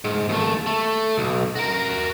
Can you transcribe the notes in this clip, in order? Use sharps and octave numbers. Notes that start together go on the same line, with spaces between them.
G#2
D#2 A3
A3
B1
F#4 A#4